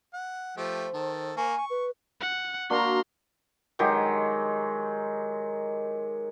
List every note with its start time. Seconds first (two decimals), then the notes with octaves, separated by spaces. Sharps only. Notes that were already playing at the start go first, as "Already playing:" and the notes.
0.14 F#5
0.57 F3 A3 G4 C5
0.94 D#3 A4
1.37 A#3 G#5 C#6
1.58 C#6
1.70 B4
2.20 F#5
2.70 A#3 D4 F#4 A#5 C6
3.79 D#3 F#3 G#3 G4